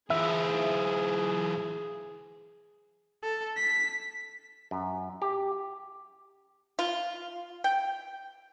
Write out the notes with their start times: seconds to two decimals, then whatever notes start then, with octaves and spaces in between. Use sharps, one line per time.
0.10 E3 F4 G#4 E5
3.23 A4
3.57 B6
4.71 F#2
5.22 G4
6.79 F4
7.64 G5